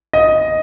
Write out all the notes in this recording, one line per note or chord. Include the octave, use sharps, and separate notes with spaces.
D#5